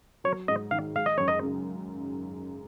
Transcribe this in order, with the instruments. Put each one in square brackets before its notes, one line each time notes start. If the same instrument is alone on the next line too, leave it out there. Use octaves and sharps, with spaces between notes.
[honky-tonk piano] F#3 [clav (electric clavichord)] C#5
[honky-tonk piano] G#2 [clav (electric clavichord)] D#5
[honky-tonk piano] D#3 [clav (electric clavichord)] F5
[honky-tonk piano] G#3 [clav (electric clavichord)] F5
[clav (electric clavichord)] D#5
[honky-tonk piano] F#2 [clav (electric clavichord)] C#5
[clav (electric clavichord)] D#5
[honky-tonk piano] C#3